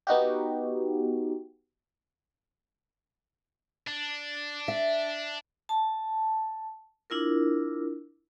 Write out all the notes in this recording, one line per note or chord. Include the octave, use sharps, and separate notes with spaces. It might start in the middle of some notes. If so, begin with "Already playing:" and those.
B3 D#4 F#4 G4
D4
E5
A5
D4 E4 F4 A#4